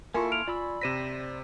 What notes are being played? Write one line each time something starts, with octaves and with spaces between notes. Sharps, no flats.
A#3 E4 F4 A4 A#4 G#5 C6 C#6
F6 D7 F7
F4 D5 B5 E6
C3 C5 A#6 B6 D#7 E7